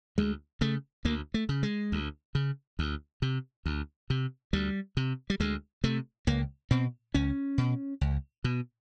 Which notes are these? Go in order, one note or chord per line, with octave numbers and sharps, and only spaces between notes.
D2 G#3
C#3 A3
D2 A#3
A3
C#3
G#3
D2
C#3
D2
C3
D2
C3
D2 G3
C3
G3
D2 G#3
C3 A3
C#2 A#3
B2 C4
C#2 C#4
B2
C#2
B2